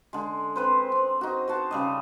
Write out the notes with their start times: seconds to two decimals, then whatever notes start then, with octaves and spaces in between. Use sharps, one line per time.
0.13 D3 G#3
0.56 C4 B4 C5
0.92 C4
1.21 D#4 F#4
1.48 F#4 C5 A5
1.71 C#3 G3 D#5